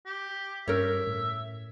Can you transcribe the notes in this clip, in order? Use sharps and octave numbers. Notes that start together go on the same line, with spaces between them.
G4
G2 C#4 A#4 C#5 E5
A2